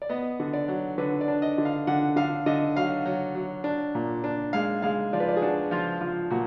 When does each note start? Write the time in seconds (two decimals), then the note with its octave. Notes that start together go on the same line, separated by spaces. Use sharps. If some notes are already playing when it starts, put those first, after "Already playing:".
0.02 D5
0.09 B3 D#5
0.40 D3
0.53 D5
0.68 F#3
0.98 D3 B4
1.21 D5
1.28 D4
1.42 D#5
1.58 D3
1.65 F5
1.87 D3 F#5
2.16 D3 F5
2.46 D3 D#5
2.76 F#3 F5
3.06 F#3
3.35 F#3
3.64 D4
3.95 A#2
4.24 D4
4.53 G#3 F5
4.82 G#3 F5
5.13 F3 D5
5.20 B4
5.29 D5
5.37 G#4
5.42 D4 F#4
5.71 F3 F4
6.01 F3 F4
6.31 A#2 F#4